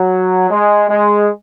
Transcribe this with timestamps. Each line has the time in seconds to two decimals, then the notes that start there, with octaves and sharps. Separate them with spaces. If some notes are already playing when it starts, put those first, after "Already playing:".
Already playing: F#3
0.50 G#3
0.88 G#3